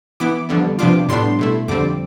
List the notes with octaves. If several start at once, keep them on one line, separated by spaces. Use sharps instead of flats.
E3 B3 E4 D6
F2 D3 G3 B3
C3 F3 B3 D4 F4 D6
A2 G3 B3 D4 C6
B2 A3 E4
F2 D3 G3 C4 D6